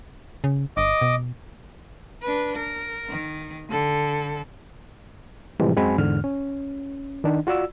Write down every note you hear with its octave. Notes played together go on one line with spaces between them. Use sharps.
C#3
G1 D#5 D6
B2
D4 B4
A#4
D#3
D3 A4
A2 C3 E3 F3 G3 G#3
F#2 G#3 C4 F#4 G#5 B5
E2 G#2 D3 F6
C#4
D#3 D4 D#4
F4 F#4 D5 E6